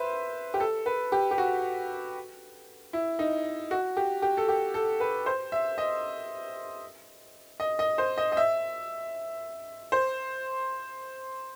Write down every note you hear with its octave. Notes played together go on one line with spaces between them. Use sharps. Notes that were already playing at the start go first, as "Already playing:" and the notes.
Already playing: B4 C5 E5
G4
A4
B4
G4
G4
F#4
E4
D#4
F#4
G4
G4
A4
G4
A4
B4
C5
E5
D#5
D#5
D#5
C5
D#5
D#5
E5
C5